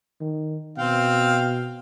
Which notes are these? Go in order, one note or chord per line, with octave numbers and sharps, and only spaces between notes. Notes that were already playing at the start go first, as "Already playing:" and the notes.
D#3
B2 C4 F5 G5